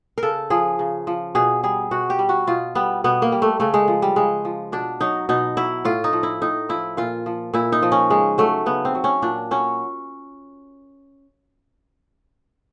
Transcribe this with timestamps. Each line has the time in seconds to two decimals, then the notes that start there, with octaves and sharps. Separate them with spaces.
0.18 A#4
0.23 C#3 A4
0.50 F3 G#4
0.79 C#3
1.07 F3
1.35 B2 G#4
1.63 G3 G#4
1.91 B2 F#4
2.10 G4
2.19 G3
2.29 F#4
2.47 B2 F4
2.75 G3 B3
3.04 B2 B3
3.22 A#3
3.32 G3
3.42 A3
3.60 C#3 A3
3.74 G#3
3.88 F3
4.02 G3
4.16 C#3 G#3
4.45 F3
4.72 B2 D4
5.01 F#3 D#4
5.29 B2 D#4
5.57 F#3 E4
5.85 A2 F4
6.04 D#4
6.13 F3
6.23 E4
6.42 A2 D#4
6.69 F3 E4
6.97 A#2 F4
7.26 F3
7.54 A#2 E4
7.72 D#4
7.83 F3
7.92 C#4
8.10 C#3 G#3
8.38 F#3 A3
8.66 C#3 B3
8.85 C4
8.95 F#3
9.04 C#4
9.22 A#2 D4
9.51 F#3 C#4